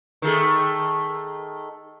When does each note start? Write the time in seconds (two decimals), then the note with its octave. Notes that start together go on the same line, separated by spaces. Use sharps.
0.22 D#3 A3 G#4